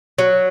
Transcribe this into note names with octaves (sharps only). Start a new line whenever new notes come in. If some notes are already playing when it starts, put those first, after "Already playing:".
F#3